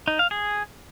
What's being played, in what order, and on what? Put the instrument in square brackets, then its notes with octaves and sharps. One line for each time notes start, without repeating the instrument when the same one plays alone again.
[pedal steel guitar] D#4
F5
G#4